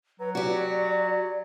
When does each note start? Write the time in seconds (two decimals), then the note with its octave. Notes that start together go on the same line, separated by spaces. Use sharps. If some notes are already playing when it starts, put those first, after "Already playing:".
0.20 F#3 B4
0.35 F#4 G4 D5